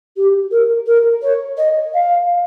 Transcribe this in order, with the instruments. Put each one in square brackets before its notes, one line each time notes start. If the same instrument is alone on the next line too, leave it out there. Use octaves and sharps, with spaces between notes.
[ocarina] G4
A#4
A#4
C#5
D#5
F5